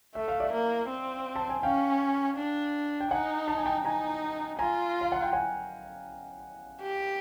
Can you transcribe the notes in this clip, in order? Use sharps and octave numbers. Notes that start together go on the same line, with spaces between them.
A3 E5
F5
D5 E5
A#3
C4
A5
G#5
C#4 F5 G5
D4
G5
D#4 F#5 G#5
A5
G#5
G5 A5
D#4 G#5 A#5
F4 G#5 A#5
F5
F#5
G5
F#5 G#5
G4